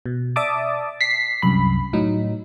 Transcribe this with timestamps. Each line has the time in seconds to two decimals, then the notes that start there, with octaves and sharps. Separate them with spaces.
0.06 B2
0.36 D5 E5 A5 D6 D#6
1.01 B6 C7
1.42 C2 F#2 B5
1.93 A2 F#3 D#4